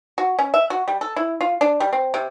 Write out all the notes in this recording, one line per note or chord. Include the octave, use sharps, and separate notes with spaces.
F#4
C#4
E5
F#4
G3
A4
E4
F4
D4
G3
C4
C3